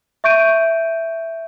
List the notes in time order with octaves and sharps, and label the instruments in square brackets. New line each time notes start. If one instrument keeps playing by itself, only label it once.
[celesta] E5 C#6 G6 D7 D#7